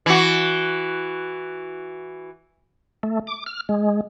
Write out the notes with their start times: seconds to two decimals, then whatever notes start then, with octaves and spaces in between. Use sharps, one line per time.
0.06 E3 F#4
3.03 A3
3.27 D6
3.46 F6
3.69 G#3